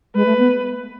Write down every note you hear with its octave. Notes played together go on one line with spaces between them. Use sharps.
G#3 B4
A3
B3